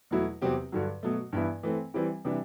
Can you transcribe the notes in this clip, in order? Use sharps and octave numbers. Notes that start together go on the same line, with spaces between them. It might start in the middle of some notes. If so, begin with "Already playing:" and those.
E2 B2 F#3 A3 E4
E2 C3 F#3 C4 G4
G2 D3 F#3
B2 F#3 A3
G2 E3 B3 E4
E3 A3 C4
E3 G3 C4 E4 G4
C3 E3 G3 D4